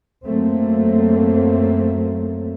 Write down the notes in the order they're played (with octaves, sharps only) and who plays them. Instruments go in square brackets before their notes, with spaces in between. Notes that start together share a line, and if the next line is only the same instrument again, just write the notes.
[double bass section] F#2 F#3 A3 A#3 C4